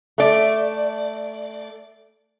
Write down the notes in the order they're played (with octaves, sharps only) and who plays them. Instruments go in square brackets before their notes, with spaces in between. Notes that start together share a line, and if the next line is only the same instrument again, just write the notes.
[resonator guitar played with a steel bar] A3 D5